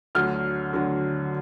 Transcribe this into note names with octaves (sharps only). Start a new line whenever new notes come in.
D2 D3 F#3 F6
D2 D3 F#3